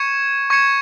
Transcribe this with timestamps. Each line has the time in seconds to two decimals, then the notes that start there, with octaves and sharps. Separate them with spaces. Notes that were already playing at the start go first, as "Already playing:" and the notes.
Already playing: C#6 G#6 C#7 E7
0.50 C#6 G#6 C#7 E7